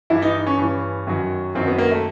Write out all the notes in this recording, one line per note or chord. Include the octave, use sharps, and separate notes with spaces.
G2 E3 E4
D#4
C#4
G2 E3 C#4
F#2 D#3 F#3
F#2 D#3 F#3 C4
B3
A#3
A3